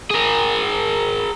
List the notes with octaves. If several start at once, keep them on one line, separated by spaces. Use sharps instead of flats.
G#4 A#4